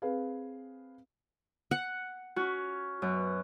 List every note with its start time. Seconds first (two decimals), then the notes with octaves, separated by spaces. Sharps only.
0.02 C4 G#4 B4 F5
1.71 F#5
2.36 C#4 F#4
3.02 F#2 B2